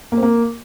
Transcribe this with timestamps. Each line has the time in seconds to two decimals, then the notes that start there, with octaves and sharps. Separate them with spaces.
0.12 A#3
0.17 C4
0.23 A#3